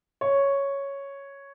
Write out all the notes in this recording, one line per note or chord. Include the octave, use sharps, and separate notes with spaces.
C#5